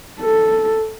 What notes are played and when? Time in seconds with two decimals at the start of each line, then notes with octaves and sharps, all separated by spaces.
0.20 A4